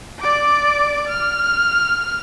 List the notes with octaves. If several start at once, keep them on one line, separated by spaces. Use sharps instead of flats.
D5 D6
F6